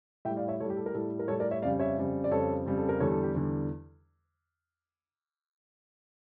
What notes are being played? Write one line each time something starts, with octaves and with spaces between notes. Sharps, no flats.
A2 G3 E5 G5
D5 F5
C#5 E5
A2 G3 A4 C#5
G4
A4
A#4
A2 G3 A4
A#4
A2 G3 A4 C#5
A#4 D5
C#5 E5
F2 C#3 G3 D5 F5
C#5 E5
F2 C#3 G3
D5
F2 C#3 G3 A4 C#5
F2 C#3 G3
A4
A#4
E2 D3 G3 A4 C#5
A4
G4
E2 D3 G3